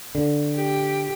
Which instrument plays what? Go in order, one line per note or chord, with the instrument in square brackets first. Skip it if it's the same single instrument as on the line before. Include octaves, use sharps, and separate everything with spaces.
[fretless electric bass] D3
[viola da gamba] G4